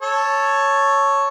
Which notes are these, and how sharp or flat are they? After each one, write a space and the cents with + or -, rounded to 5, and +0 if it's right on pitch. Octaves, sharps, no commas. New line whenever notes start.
A4 +0 C#5 +0